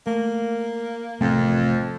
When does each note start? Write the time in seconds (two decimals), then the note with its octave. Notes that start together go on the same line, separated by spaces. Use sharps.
0.07 A3 A#3
1.21 A1 F2 C3 F3 A3 C4